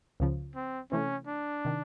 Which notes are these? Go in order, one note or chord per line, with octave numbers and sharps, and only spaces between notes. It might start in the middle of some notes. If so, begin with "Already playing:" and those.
C#2 C#3 F3
C4
C3 E3 A3 C#4
D4
C3 D#3